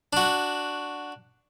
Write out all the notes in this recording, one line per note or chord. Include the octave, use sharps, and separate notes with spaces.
D4 F#4